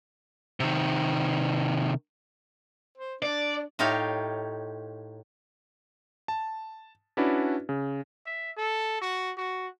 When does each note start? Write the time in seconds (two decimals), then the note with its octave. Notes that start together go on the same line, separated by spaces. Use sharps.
0.60 C3 D#3
2.98 C5
3.22 D4 D5
3.79 A2 D#4 F4 G4 C#5 F5
6.28 A5
7.17 C#4 D4 E4 F#4 B4 D5
7.69 C#3
8.25 E5
8.57 A4
9.01 F#4
9.37 F#4